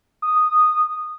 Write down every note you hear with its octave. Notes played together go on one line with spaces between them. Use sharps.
D#6